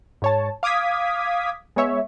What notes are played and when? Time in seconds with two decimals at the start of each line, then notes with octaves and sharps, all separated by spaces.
0.22 G#2 C#5 A5
0.63 F5 D6 D#6 G#6 B6
1.76 G#3 B3 C#5 E5